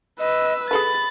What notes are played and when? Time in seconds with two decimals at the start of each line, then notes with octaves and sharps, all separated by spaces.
0.19 B4 D#5 E6
0.71 G#4 A4 B4 B5 A6